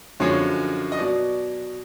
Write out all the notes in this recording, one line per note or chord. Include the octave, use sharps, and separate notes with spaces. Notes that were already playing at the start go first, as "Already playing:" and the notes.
F#2 D3 F3 G#3 C#5
D#5
B2 F#3 D5